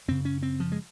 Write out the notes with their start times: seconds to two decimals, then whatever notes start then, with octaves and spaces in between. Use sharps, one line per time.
0.08 F#2 C#3 C4
0.25 C#4
0.43 C4
0.60 F3
0.72 G#3